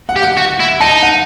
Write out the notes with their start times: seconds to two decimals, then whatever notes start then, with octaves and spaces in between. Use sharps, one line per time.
0.09 F#5
0.16 G4
0.22 F#5
0.37 F#4
0.60 E4
0.80 D#4 A5
1.02 F#5